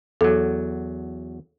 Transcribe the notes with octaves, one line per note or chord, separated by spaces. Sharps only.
E2 F#3 A4